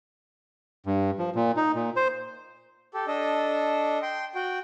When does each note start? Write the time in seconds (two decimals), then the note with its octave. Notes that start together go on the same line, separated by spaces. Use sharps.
0.86 G2
1.19 F3
1.35 A#2
1.57 D#4
1.75 A#2
1.96 C5
2.94 G4 A4
3.07 D4 A4 D#5
4.02 G5 C6
4.35 F#4 G5